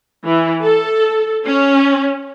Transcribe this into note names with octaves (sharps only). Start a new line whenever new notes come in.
E3
A4
C#4